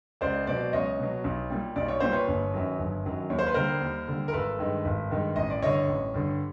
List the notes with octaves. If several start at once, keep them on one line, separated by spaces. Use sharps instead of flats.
C#2 C5 D5
B2 F#3 C5 D5
C#2 C#5 D#5
B2 F#3
B1
A#2 G3
B1 D5
C#5
A#2 G3 C5
B4 C#5
G1
F#2 D#3 F#3
G1
F#2 D#3 F#3
D#2 C#5
C5
B4
D3 G3 A#4 C5
D#2
D3 G3
A#4
G#1 A4 B4
G2 D#3 G#3
G#1
G2 D#3 G#3
A1 D#5
D5
G2 D3 C#5 D#5
A1
G2 D3